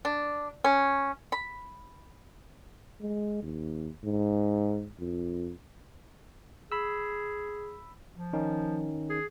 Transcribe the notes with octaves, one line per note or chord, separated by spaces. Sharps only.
D4
C#4
B5
G#3
D#2
G#2
F2
G#4 B5 E6
F3
D#3 C#4 D#4
G#4